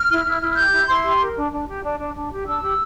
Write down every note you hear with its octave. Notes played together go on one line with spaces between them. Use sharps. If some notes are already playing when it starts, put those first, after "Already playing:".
Already playing: F6
E4
E4
E4
G4 G6
E4
E4 C6
G4
A#4
D4
D4
G4
D4
D4
D4
G4
D4 E6
G4